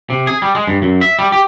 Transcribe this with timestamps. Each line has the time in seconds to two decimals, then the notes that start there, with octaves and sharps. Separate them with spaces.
0.10 C3
0.27 G#4
0.42 G3
0.55 G#3
0.67 G2
0.82 F#2
1.01 E5
1.19 G3
1.32 G4